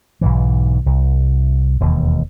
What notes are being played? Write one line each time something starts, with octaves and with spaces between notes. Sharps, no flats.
B1 G#2 E3
C2
E1 D#2